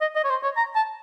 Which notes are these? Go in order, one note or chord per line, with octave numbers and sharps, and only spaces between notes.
D#5
D#5
C#5
C5
C#5
A#5
A5